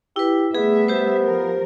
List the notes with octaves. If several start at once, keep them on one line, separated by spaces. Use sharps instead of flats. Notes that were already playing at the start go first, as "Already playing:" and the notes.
E4 G4 B4
G3 A3 B3 G#4 E5
G4 C5
F3 A#4